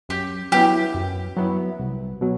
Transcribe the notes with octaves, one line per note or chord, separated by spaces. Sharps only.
F#2 G4
F#3 B3 E4 G4
F#2
F#3 B3 E4
C2
B2 F#3